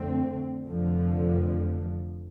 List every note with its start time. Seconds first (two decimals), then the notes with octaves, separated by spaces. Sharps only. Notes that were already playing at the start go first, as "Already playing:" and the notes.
Already playing: F2 D3 A3 C4
0.65 F1 F2 D3 F3